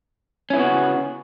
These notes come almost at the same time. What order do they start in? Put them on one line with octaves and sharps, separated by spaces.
C#4 E4 B3 F#4 C#3